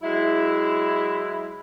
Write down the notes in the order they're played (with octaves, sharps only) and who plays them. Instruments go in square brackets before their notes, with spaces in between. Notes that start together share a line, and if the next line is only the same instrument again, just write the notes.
[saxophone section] F#3 G#3 E4